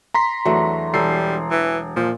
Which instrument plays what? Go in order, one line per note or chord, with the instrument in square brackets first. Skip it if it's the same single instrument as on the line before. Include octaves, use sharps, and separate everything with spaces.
[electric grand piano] A#5 C6 B6
[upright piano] E2 [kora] F#3 A3 D4
[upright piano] E1 C7 [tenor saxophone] G3 [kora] A4
[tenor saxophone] E3
[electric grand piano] A#2 [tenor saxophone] F3